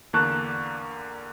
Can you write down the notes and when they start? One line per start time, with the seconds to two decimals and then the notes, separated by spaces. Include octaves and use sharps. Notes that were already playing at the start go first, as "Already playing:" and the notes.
0.13 E2 D3 A#3 A5 C#6 F#6